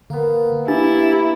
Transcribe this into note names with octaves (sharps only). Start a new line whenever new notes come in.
D3 A#3 B3
D4 E4 G4 A6